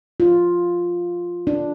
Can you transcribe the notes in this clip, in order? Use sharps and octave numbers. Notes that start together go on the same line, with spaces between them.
F4
D4